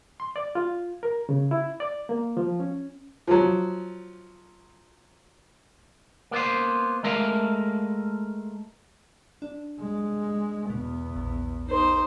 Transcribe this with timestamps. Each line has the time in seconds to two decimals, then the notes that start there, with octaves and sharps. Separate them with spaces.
0.20 C6
0.36 D5
0.55 F4
1.03 A#4
1.29 C#3
1.51 E4
1.80 D5
2.09 A#3
2.37 F3
2.60 C#4
3.28 F3 F#3
6.31 A#3 B3 C5
7.03 G#3 A3 A#4 F5
9.42 D4
9.81 G#3
10.70 E2 B2 B3
11.16 A#1
11.67 D#4 C5